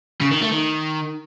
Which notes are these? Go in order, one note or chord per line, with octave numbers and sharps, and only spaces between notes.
C#3
D#3
A3
D#3